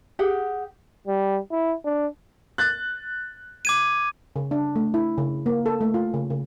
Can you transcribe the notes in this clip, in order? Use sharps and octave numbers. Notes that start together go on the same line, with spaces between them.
G4 G#4 F#5
G3
E4
D4
F#6 A6
D6 G#6 D#7
C#3
D4
A3
E4
C#3
A#3
A4
A3
F4
C#3
C#3